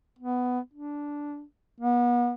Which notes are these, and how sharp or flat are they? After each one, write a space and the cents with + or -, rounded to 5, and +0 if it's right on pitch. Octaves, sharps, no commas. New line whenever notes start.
B3 +10
D4 -10
B3 -35